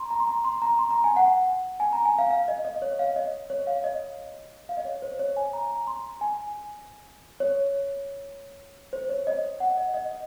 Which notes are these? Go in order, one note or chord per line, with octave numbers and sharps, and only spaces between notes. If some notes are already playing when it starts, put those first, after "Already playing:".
Already playing: A#5 C6
A#5
C6
A#5
C6
A#5
C6
A#5
G#5
F#5
G#5
A#5
G#5
F5
F5
D#5
D#5
C#5
F5
D#5
C#5
F5
D#5
F5
D#5
C#5
C5
C#5
G#5
A#5
A#5
C6
G#5
C#5
C5
C#5
D#5
F#5
D#5
D#5
D#5